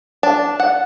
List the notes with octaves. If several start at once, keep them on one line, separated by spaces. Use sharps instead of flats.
D4
F#5